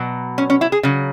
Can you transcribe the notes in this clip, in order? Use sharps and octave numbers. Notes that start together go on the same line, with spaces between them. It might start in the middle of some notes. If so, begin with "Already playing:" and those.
Already playing: B2 F#3
C#4
C#4
E4
G#4
C#3 F#3